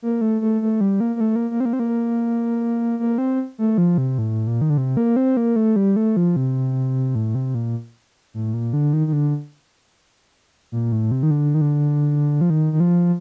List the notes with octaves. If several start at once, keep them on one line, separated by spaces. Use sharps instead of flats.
A#3
A3
A3
A3
G3
A#3
A#3
A3
A#3
A#3
C4
A#3
C4
A#3
A#3
C4
A3
F3
C3
A2
A#2
D#3
D3
C3
A#3
C4
A#3
A3
G3
A3
F3
C3
A2
C3
A#2
A2
A#2
D3
D#3
D#3
D3
A#2
A2
C3
D#3
D3
D#3
D3
F3
D#3
D#3
F3